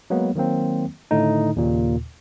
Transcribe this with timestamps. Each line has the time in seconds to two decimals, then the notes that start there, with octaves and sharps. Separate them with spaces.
0.10 F#3 G#3 A#3 B3
0.35 D#3 F#3 A#3 C4
1.11 A2 D3 D#3 A3 D#4
1.56 D#2 A#2 C#3